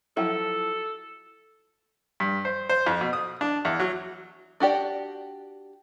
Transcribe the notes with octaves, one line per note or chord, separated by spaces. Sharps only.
F3 F#3 E4 A4
G2
C5
C5
F2
B2
D#6
D4
E2
F#3
D4 F#4 G4 D5